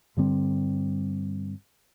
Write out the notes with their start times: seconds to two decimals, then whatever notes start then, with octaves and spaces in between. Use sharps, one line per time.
0.17 G2 D3 G3 C4